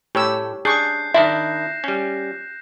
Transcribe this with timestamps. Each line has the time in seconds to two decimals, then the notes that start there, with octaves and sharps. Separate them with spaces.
0.15 A2 G4 C#5 E6
0.65 D4 G#4 C#6 F#6 G6 C7
1.14 D#3 D4 E4 E5 A#6 E7
1.84 G3 C#4